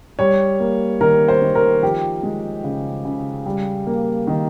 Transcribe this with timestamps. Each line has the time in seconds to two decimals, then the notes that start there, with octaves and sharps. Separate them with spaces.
0.19 G3 C#5
0.60 A#3
1.01 D#3 A#4
1.28 C5
1.41 D#3
1.55 A#4
1.82 F3 G4
2.23 G#3
2.64 C#3
3.05 C#3
3.46 G3
3.87 A#3
4.27 D#3